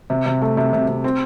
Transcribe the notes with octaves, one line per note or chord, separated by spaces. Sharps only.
C3
C3
A3
C3
C3
C3
C4